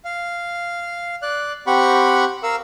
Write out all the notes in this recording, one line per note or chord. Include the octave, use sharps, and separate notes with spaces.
F5
D5 F#6
C4 G4 F#5 B5 C#6
A#4 F5 E6